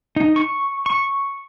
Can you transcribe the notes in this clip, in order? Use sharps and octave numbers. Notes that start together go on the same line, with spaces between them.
D#4
C#6
C#6